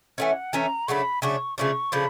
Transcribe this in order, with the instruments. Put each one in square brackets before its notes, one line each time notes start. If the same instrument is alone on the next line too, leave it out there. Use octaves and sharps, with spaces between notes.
[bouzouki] E3 A3 C#4 [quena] F#5
[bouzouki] E3 A3 C#4 [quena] A#5
[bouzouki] C#3 F#3 A3 D4 [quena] B5 C#6
[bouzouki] C#3 F#3 A3 D4 [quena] C#6
[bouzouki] C#3 F3 A3 D4 [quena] C#6
[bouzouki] C#3 F3 A3 D4 [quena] B5